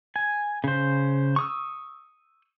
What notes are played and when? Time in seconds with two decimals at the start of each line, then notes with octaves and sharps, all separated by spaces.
0.16 G#5
0.64 C#3 C5
1.36 C#6 D#6 E6